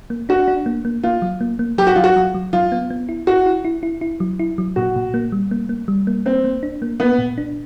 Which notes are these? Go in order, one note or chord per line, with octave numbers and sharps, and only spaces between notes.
A#3
D4 F#4
D4
A#3
A#3
A#3 F4
F#3
A#3
A#3
F#3 G4
F#4
F#3 F4
F#4
F#3
F#3
F#3 F4
B3
B3
E4
E4 F#4
E4
E4
E4
E4
F#3
E4
F#3
A#2 F#4
A#2
A#3
G3
A#3
A#3
G3
A#3
A#3 C4
A#3
D4
A#3
A#3 B3
A#2
D4